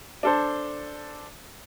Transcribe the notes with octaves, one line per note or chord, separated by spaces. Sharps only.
D4 A4 C5